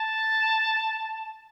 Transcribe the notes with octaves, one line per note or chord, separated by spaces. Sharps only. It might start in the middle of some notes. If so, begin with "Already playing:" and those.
Already playing: A5